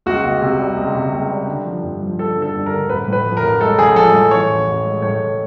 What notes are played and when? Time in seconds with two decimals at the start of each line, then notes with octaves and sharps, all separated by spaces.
0.06 C#2 F#4
0.24 C#2
0.42 C3
0.59 G3
0.77 C#2
0.95 C3
1.12 C#2
1.30 G3
1.47 D3
1.65 F3
1.83 G2
2.02 F3
2.18 F3 A4
2.37 D3
2.42 A4
2.54 G2
2.66 A#4
2.71 D3
2.89 A1 B4
3.08 A2 B4
3.24 F3
3.37 A#4
3.43 A1
3.61 G#3 A4
3.78 A1 G#4
3.95 F3 A4
4.14 A2
4.31 E3 C#5
4.49 A1
4.67 A1
4.84 G#3
5.02 A2 C#5
5.20 A2